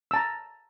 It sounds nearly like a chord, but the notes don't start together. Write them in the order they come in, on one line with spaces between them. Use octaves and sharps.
E6 A5 A#5